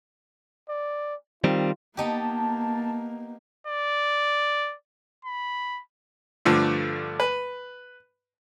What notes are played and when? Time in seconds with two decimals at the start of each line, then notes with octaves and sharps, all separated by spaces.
0.69 D5
1.44 D#3 G3 C4 F4
1.97 A#3 B3 D#4 G4 A5
3.67 D5
5.25 B5
6.45 G2 D3 F3 A3
7.20 B4